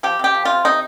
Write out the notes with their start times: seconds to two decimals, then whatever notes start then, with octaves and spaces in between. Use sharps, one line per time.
0.03 F3 G4
0.19 C3 G4
0.35 F3
0.45 C3 F4
0.65 C3 D#4